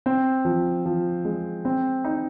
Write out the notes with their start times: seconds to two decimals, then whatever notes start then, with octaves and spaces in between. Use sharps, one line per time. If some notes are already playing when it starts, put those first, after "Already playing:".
0.06 C4
0.45 F3
0.86 F3
1.25 G#3
1.65 C4
2.04 D#4